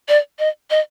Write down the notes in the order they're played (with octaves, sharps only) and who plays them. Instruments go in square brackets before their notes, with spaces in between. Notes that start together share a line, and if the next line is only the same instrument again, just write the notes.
[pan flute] D5
D#5
D#5